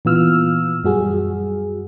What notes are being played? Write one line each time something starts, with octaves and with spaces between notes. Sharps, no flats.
A#2 E3 B3 F4 E6 F6
F#2 G3 F#4 G#4